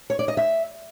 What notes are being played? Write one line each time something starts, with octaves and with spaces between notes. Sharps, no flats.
C#5
D5
D#5
E5